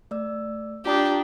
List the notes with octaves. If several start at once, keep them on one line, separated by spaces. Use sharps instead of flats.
A3 D5 E6
D4 F4 G4 A#5 D#6